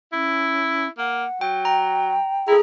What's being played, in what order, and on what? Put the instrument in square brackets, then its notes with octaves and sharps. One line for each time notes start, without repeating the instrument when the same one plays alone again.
[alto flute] C#4 [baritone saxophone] E4
[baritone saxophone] A#3 [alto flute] F#5
[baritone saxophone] F#3 [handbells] G5
[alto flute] G5 [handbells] A#5
[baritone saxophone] E4 [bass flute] G#4 [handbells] A4 A#5